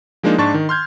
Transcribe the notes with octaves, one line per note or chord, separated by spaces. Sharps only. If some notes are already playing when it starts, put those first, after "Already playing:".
F3 G#3 A#3 D4 D#4
G#2 D4 A5 C#6 A6
D#3
C6 F6 G6 G#6